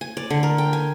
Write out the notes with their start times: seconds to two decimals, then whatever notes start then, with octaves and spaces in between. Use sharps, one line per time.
0.01 G#5
0.17 D5
0.30 D3
0.43 A#4
0.58 G5
0.73 G#5